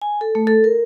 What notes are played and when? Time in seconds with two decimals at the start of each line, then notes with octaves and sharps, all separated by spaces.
0.02 G#5
0.21 A4
0.35 A3
0.47 A4
0.64 A#4